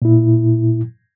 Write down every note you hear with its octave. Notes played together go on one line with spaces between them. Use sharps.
A#2 E4